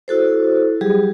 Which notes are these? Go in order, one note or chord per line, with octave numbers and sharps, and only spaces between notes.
E4 F#4 A4 C5
F#3 G3 G4 G#4